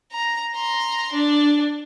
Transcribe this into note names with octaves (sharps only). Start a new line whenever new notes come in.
A#5
A#5 C6
D4